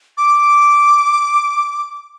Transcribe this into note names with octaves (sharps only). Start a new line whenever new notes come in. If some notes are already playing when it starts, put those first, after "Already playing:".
D6